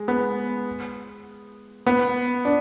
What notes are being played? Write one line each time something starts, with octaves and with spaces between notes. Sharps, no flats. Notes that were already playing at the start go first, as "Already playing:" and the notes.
Already playing: G#3
B3
B3
D4